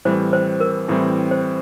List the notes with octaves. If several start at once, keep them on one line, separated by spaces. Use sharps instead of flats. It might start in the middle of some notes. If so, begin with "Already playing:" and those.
A2 E3 G3 C4 C5
C5
A#4
A2 E3 G3 C4 E4
C5